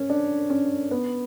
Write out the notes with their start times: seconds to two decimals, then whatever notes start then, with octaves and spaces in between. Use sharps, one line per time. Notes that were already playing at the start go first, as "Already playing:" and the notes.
Already playing: C#4
0.10 D4
0.50 C#4
0.91 B3